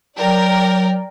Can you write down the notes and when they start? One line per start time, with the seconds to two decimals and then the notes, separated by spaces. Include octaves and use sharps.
0.20 F#3 A#4 D5 G5